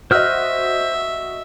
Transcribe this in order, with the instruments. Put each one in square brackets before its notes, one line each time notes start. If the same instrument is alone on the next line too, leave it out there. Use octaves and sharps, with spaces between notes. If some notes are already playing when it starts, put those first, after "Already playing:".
[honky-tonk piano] F#4 D#5 [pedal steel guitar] C5 F6 F#6 [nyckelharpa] E5